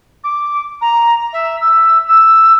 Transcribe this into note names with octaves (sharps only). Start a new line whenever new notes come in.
D6
A#5
E5
E6
E6